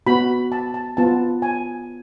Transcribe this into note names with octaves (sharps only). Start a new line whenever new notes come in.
B3 F#4 B5
A5
A5
B3 F4 A5
G#5